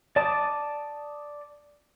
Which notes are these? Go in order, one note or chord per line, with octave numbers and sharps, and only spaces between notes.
D5 A5 D6 D#6